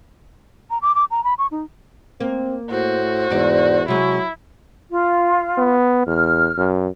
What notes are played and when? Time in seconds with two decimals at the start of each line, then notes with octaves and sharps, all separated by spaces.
0.70 A#5
0.82 D6
0.95 D6
1.11 A#5
1.24 B5
1.38 C#6
1.51 D#4
2.20 A#3 C4
2.71 A2 F#4 C5
3.30 E2 G#2 D5
3.88 C3 F#3 G#3 E4 F#4
4.91 F4
5.58 B3
6.07 E2 F6
6.58 F#2